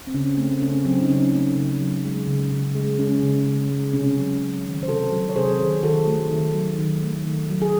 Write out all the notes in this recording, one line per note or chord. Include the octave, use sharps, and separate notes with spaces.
C4
C#3 C#4
A3 C4
C#3 C#4
F#3 C4
D#4
C#3 C#4
A3
C#3
F#3
G#3
C#3
C#3
G#3
G#3 C#4
C#3
C#3
G#3
C3 C#4
F#3
C3
D#3
C5
C3 F#4 A4
F#3
C#5
C3 G#4 C5
D#3
D#3 F#4 A4
A3
D#3
F#3
D#3
A3
D#3
F#3
G#4